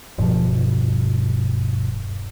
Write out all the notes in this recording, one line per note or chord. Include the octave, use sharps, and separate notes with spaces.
D#1 G2 B2 F3